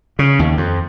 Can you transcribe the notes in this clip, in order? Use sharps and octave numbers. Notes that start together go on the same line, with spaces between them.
C#3
D#2
F2